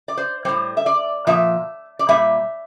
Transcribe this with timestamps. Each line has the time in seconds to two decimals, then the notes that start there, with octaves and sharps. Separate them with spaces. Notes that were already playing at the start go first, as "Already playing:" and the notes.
0.08 D5
0.17 C5
0.45 A2 G3 C5
0.77 E5
0.86 D5
1.27 A#2 F3 E5
1.99 D5
2.09 A#2 G3 E5